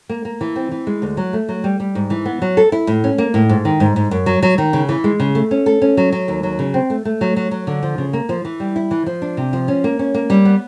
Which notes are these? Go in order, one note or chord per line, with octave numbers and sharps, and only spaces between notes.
A#3
A#3
E3
C4
E3
G#3
D2
F#3
A3
F#3
G3
G3
G#2
E3
B3
F#3
A4
E4
A2
C#4
A#3
A2
G#2
D#3
G#2
G#2
F#2
F#3
F#3
D#3
C#3
E3
G#3
C#3
A3
C#4
A4
C#4
F#3
F#3
D#2
F#3
C#3
C4
A3
A3
F#3
F#3
F#3
D3
F3
C#3
A#3
F3
E3
G3
E4
E3
F3
D4
C3
F3
C#4
A#3
C#4
A#3
G3
B3